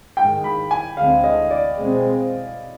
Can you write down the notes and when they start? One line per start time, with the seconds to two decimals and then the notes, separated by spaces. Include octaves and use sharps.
0.17 G#2 D#3 G#3 G5
0.44 B5
0.71 G#5
0.97 D2 D3 G#3 C4 F5
1.24 D#5
1.51 D5
1.78 B2 G#3 C4